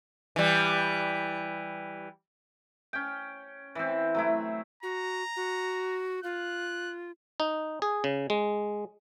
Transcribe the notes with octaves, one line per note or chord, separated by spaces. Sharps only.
E3 G3
C#4 G5
E3 C4
F#3 A3 E4
F#4 A#5
F#4
F4 F#6
D#4
G#4
C#3
G#3